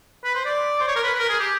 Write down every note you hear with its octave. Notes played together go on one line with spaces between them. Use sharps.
B4
C5
D5
C5
C#5
A#4
B4
B4
A#4
G#4
G4